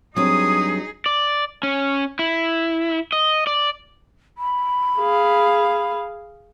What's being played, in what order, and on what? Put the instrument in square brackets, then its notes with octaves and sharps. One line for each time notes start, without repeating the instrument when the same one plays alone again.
[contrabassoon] G2 [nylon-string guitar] F#3 C4 [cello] D#4 G#4 [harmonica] D#6
[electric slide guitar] D5
C#4
E4
D#5
D5
[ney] B5
[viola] G#4 F5